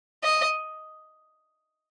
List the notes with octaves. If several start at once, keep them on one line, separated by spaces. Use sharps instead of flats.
D#5